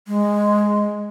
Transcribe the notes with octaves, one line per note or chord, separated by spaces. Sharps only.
G#3